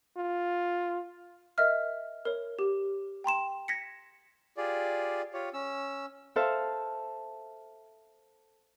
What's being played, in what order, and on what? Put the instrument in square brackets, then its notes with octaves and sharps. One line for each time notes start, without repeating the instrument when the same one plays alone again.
[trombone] F4
[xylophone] A#4 D#5 E5 F6
A#4 C#5
G4
G5 A#5 C6 E7
G#6 A#6 B6 C#7
[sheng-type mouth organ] F4 G4 G#4 D5
F4 G4 C#5
C#4 E6
[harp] A4 C5 E5 F5